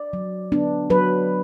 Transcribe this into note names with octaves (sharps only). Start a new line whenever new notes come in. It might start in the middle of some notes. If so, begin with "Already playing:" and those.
Already playing: D5
F#3
B3 D4
F#3 B4